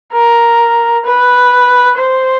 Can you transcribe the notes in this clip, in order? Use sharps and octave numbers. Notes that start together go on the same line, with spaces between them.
A#4
B4
C5